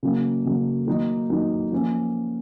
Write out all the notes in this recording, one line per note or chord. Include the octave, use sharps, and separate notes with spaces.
C#3 F#3 A#3
C#3 F#3 A#3
D#3 F#3 A#3 D#4
D#3 F#3 A#3 D#4
F3 A#3 C#4